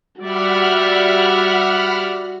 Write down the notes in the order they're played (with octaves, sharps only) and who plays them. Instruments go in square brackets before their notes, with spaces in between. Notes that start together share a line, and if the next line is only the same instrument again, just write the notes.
[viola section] G3 D5 E5 [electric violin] F#4 [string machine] F#5 B5 F6